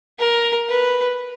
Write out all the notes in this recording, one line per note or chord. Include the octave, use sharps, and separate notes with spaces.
A#4
B4